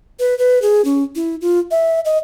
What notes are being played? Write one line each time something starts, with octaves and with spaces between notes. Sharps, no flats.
B4
B4
G#4
C#4
E4
F4
E5
D#5